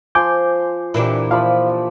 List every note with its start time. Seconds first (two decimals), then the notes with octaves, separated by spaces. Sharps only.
0.15 F3 G#5 C6 D6 G6
0.94 A#2 E3 D4 E4 G4
1.31 F3 D5 F5 B5